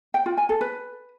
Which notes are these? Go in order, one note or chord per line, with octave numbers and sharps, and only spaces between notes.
G5
F4
G#5
A4
B4